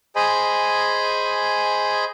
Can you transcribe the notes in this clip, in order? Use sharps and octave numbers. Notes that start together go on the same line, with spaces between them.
G#4 C5 D#5 G#5 B5